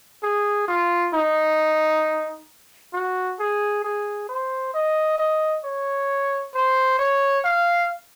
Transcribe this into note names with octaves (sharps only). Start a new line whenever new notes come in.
G#4
F4
D#4
F#4
G#4
G#4
C5
D#5
D#5
C#5
C5
C#5
F5